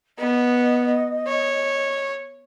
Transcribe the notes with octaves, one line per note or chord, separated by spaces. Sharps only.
B3 D#5
C#5